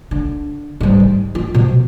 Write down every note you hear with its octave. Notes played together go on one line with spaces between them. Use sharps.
D3
G#2 G3
D#3
F4
B2 F3